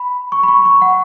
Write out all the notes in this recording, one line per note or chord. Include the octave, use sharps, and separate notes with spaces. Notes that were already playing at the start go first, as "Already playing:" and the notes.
Already playing: B5
C#6
B5
C#6
C#6
F#5